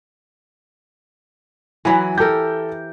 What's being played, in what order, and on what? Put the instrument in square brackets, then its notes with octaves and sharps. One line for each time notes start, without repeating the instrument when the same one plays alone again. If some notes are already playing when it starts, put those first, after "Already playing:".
[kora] E3 F#3 E4 [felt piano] G#5 B5
[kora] G4 A#4 [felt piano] A4 G6